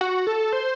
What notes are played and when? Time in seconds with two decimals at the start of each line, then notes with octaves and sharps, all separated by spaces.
0.01 F#4
0.27 A4
0.53 C5